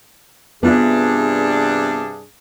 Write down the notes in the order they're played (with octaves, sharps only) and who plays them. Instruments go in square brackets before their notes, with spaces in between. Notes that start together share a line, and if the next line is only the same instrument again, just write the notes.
[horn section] G2 C3 D4 [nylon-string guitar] B3 F4 E5 [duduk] G#4